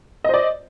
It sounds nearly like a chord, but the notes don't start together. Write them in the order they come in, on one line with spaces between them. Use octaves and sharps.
D#5 C5 D5